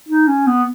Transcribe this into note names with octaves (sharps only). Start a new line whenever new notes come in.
D#4
C#4
B3